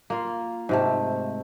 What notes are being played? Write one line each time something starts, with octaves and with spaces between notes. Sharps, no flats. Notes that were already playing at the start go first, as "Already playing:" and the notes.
A#3 F4
G#2 C3 A3